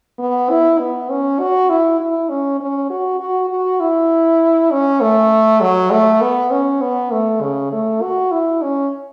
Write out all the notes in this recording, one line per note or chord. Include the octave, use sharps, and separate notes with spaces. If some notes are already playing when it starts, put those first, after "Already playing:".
B3
E4
B3
C#4
F#4
E4
E4
C#4
C#4
F#4
F#4
F#4
E4
C#4
A3
F#3
A3
B3
C#4
B3
A3
C#3
A3
F#4
E4
C#4